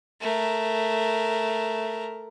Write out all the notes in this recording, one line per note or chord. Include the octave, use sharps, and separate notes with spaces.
A3 A#4